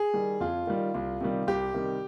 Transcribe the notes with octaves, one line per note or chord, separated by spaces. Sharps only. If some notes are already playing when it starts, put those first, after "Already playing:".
Already playing: G#4
D#3 G3
F2 F4
D#3 G3
C2
C3 D#3 G3
C2 G4
C3 D#3 G3